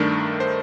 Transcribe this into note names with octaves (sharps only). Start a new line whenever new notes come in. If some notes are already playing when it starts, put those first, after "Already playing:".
Already playing: G2 D#3 A3 D4 A#4
C5